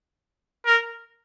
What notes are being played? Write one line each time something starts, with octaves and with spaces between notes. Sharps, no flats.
A#4